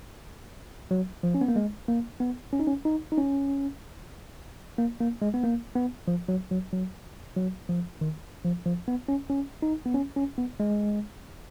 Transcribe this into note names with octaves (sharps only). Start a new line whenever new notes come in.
F#3
F3
C#4
B3
A#3
G#3
A#3
B3
C#4
D#4
C#4
D#4
D#4
C#4
A#3
A#3
G#3
B3
A#3
B3
F3
F#3
F#3
F#3
F#3
F3
D#3
F3
F3
B3
C#4
C#4
D#4
B3
C#4
C#4
B3
G#3